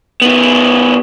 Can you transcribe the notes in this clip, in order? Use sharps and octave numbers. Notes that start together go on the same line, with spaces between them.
D#3 B3